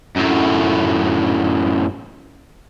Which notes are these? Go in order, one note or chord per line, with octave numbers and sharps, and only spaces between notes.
F#2 A2